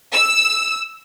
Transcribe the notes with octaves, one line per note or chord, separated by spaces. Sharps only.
E6